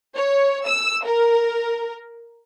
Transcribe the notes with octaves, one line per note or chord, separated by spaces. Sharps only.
C#5
E6
A#4